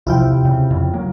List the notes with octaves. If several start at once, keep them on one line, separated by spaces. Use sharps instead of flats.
C2 C3 F3 E4 F4 G5
D#2
C#3
F2 C#3
F#3 A#3